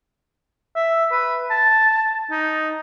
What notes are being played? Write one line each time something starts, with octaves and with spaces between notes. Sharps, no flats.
E5
B4
A5
D#4